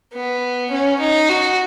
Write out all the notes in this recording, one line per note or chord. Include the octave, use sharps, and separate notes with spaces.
B3
C#4
D#4
F#4